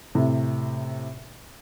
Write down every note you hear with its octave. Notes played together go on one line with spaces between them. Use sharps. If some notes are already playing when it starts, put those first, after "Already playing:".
A2 C3